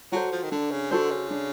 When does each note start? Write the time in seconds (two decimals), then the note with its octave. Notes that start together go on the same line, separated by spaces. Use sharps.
0.12 F#3 F#4 A4 C5
0.32 F3
0.43 D#3
0.52 D3 D4
0.71 C#3
0.91 D3 F#4 A4 C5
1.11 C#3
1.31 D4